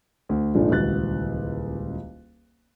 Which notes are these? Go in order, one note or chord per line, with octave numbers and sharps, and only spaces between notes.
D2
A#1 G#2 D3 F3 D4 A4
D#1 C#2 E3 F#4 F#6 A6